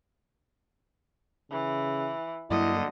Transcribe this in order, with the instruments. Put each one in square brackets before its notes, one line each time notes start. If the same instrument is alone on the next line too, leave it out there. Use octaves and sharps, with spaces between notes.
[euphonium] C#3 [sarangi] E3
[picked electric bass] G2 F#3 A#3 [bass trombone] D3 [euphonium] E4 [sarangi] D#5